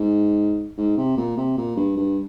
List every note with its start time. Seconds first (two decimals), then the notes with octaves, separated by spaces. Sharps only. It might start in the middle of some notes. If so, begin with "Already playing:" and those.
Already playing: G#2
0.78 G#2
0.97 C3
1.17 A#2
1.37 C3
1.57 A#2
1.76 G2
1.97 G2